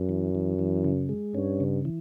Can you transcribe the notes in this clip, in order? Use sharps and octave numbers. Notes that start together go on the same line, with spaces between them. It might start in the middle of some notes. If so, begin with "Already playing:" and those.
Already playing: F#2
E3
E3
E3
C#3
G#3
G2 C#4
C#3
E3